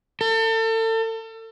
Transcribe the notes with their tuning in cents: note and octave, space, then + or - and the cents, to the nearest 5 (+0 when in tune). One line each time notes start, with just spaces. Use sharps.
A4 +35